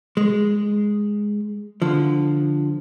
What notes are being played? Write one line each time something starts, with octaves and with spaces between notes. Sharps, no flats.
G#3
D3 F3